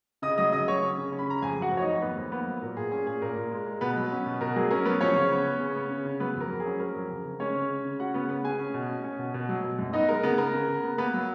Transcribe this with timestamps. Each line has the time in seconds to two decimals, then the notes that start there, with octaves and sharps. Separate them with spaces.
0.22 C#3 D#5 D#6
0.38 F#3 D#5 D#6
0.53 C#3 D#5 D#6
0.68 F#3 C#5 C#6
0.83 C#4
0.98 C#3
1.12 C#4
1.19 B5
1.27 C#3 A#5
1.42 F2 G#4 G#5
1.57 F#3 F#4 F#5
1.72 F2
1.77 C#5
1.82 D#4 D#5
1.87 F2
2.02 D#3 B3 B4
2.17 F2
2.32 A#3 B3 B4
2.47 F#3
2.62 A#2 A#4
2.77 A#2 G#4
2.92 C#4 G#4
3.06 A#2 G#4
3.22 A#2 A#4
3.36 A#2
3.51 G#3
3.66 G#3
3.81 B2 B3 B4
3.96 F#3
4.11 C#4
4.26 B2
4.41 B2 A#4
4.56 F#3 G#4
4.71 C#4 A#4
4.85 F#3 B3 B4
5.01 F3 C#4 C#5
5.16 C#3
5.31 B3
5.46 B3
5.60 C#3
5.76 B3
5.90 C#3
6.05 C#3
6.20 F#3 B3 B4
6.35 F2
6.41 A#4
6.50 F#3
6.60 G#4
6.66 C#4
6.80 F#3 A#4
6.95 F2
7.10 C#3
7.25 C#3
7.40 G#3 C#4 C#5
7.55 C#3
7.69 C#3
7.85 C#3
7.99 C#4 F#4 F#5
8.14 C#3 B3 B4
8.29 B3 C#4 B4
8.44 C#4 G#4 G#5
8.59 C#4
8.74 B2
8.89 C#4
9.04 C#4
9.19 B2
9.34 B2
9.49 F#3
9.64 B2
9.79 F#2
9.93 B3 D#4 D#5
10.09 G#3 A#4
10.23 C#3 B3 B4
10.38 B3 A#4
10.53 C#3
10.68 C#3
10.83 B3
10.98 A#3 B3 B4
11.14 F#3